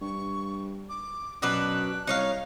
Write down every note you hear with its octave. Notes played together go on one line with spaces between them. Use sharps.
G2 C#6
D6
F#2 B2 D4 B4 F#6
C2 D#4 C#5 F5